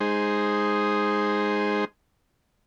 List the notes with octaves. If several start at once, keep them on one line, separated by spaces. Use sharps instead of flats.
G#3 D#4 G#4 C5